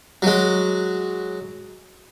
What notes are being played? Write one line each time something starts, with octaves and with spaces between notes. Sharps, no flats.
F#3 G#3